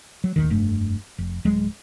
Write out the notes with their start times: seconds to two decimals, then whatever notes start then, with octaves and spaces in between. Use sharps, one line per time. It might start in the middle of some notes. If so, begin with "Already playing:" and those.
0.24 F#3
0.36 D1 D#2 D#3
0.50 F1 G2 A3
1.18 F1
1.45 D1 F#3 G#3